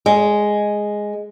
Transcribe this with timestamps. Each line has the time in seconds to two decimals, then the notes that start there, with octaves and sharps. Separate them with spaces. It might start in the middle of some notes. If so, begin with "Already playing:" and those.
0.06 G#3